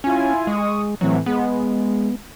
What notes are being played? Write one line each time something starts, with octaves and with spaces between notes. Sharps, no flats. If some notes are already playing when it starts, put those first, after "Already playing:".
C#4 E4 F4 G#5
G#3 C#6 D#6
A2 C3 E3 F#3
G#3 B3